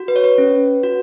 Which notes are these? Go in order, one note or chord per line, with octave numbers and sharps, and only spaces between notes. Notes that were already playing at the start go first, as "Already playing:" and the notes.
Already playing: F#4
B4
C#5
B4
C#4
F#4